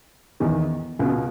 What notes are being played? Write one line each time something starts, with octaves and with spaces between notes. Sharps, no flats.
E2 D#3
C#2 B2